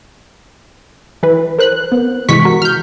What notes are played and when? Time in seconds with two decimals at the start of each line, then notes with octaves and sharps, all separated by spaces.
1.23 E3 B4
1.58 A#4 C5 F#6
1.92 B3
2.29 G2 C3 E3 G#3 C#6 B6
2.45 F#4 A#4
2.62 F6 G6